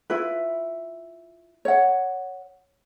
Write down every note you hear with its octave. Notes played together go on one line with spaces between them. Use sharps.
E4 F4 B4
C#5 F#5